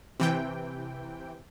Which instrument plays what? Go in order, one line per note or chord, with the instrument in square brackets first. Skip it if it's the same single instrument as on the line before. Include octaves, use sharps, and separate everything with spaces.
[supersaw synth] C3 E3 G5